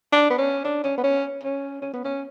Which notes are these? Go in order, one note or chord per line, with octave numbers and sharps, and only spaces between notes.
D4
B3
C#4
D4
C#4
B3
C#4
C#4
C#4
B3
C#4